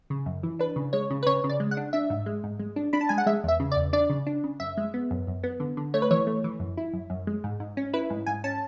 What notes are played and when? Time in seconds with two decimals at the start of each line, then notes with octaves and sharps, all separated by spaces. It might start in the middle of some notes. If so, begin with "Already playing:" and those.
0.10 C#3
0.26 F#2
0.43 E3
0.59 D4 B4
0.76 C#3
0.93 G#3 C#5
1.10 C#3
1.23 B4
1.26 C#3 C#5
1.44 C#3
1.49 D5
1.60 G#3
1.71 F#5
1.77 D4
1.93 D4 E5
2.10 G#2
2.26 G#3
2.44 G#2
2.60 G#3
2.76 D4
2.93 D4 B5
3.01 A5
3.09 G#3 G#5
3.18 F#5
3.26 G#3 E5
3.44 E2 E5
3.60 C#3
3.72 D5
3.76 E2
3.93 D4 D5
4.10 C#3
4.27 D4
4.44 C#3
4.60 F#2 E5
4.77 G#3
4.94 B3
5.11 F#2
5.27 F#2
5.43 B3
5.60 D3
5.77 D3
5.94 A3 C#5
6.02 B4
6.11 E3 C#5
6.27 A3
6.44 E3
6.60 F#2
6.77 E4
6.93 F#2
7.10 F#2
7.27 G#3
7.44 G#2
7.60 G#2
7.77 C#4
7.93 E4 B4
8.10 G#2
8.26 G#2 G#5
8.44 C#4 A5